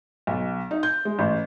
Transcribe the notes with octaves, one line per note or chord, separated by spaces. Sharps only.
B1
D#4
G6
G#3
A1